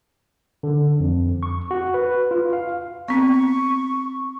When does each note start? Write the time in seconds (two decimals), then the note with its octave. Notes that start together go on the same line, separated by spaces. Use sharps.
0.63 D3
1.00 F2
1.43 C#6
1.71 F#4
1.94 B4
2.31 F4
2.53 F5
3.08 B3 C4 C#6